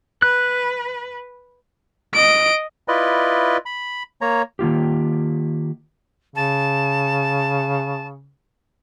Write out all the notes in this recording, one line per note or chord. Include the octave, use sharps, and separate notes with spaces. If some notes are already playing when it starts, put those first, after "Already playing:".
B4 F#6
D#5 D7
E4 F4 B4 D5 D#5
B5
A#3 C#5 A#5
D#3 A#3 F4 G4
C#3 A5